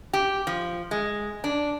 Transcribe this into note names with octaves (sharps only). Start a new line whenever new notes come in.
G4
F3
G#3
D4